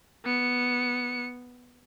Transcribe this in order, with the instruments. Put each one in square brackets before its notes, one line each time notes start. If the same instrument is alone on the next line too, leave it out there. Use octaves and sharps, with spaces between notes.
[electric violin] B3 C#7